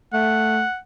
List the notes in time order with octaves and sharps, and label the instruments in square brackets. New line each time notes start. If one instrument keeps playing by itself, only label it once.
[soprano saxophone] A3 [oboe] F#5